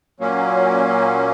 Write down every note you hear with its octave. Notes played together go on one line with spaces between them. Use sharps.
A#2 F#3 A#3 C#4